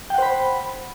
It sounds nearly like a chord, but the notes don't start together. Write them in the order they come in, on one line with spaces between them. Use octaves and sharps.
G5 F#5 C5 B5